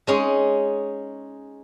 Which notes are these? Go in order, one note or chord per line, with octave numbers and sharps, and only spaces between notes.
G#3 C#4 D#4 G#4